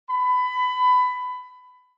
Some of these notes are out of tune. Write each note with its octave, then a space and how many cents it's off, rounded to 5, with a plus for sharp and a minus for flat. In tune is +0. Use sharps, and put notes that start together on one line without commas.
B5 +20